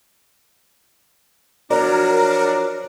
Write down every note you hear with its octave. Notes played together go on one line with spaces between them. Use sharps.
F3 F#3 D4 F#4 A#4 D5